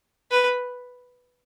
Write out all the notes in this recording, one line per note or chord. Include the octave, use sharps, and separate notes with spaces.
B4